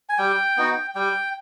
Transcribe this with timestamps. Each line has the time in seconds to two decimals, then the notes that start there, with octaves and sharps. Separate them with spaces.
0.09 G#5
0.18 G3 G5
0.57 B3 D#4 F#4
0.95 G3 G5